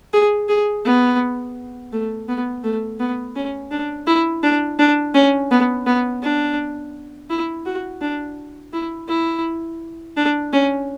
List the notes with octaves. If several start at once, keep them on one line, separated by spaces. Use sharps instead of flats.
G#4
G#4
B3
A3
B3
A3
B3
C#4
D4
E4
D4
D4
C#4
B3
B3
D4
E4
F#4
D4
E4
E4
D4
C#4